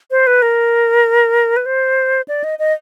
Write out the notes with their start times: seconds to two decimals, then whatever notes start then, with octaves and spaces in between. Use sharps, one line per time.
0.11 C5
0.27 B4
0.42 A#4
1.57 B4
1.66 C5
2.28 D5
2.44 D#5
2.59 D#5